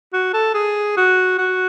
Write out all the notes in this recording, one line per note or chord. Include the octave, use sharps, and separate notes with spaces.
F#4
A4
G#4
F#4
F#4